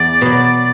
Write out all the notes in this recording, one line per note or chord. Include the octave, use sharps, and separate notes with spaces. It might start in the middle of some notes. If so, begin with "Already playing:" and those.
Already playing: E2 D5
B2 F#3